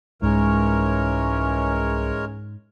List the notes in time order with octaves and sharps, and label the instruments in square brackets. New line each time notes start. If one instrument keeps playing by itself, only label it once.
[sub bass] C2 [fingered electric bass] G#2 [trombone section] E3 C#4 [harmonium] G#3 A#4 C#5